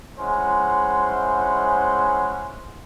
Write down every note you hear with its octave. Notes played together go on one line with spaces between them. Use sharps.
G#3 C#4 E4 C5 F#5